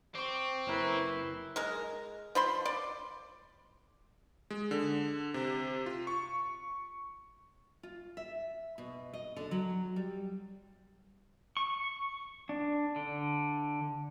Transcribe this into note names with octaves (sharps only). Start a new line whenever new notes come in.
C4 C#6 D6
F#1 C#4 E4 A#4 B4
G#3 A#4
F3 B5 C6
D5
G#3
D3
C3
F4
C#6
F4
E5
B2
D#5
D3
F#3
G3
C#6
D4
D3